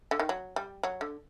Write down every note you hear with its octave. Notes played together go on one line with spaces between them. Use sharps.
D3
D#3
F#3
G3
F#3
D3